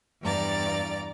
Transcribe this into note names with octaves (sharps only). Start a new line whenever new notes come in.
E2 G2 D5 A#5 A6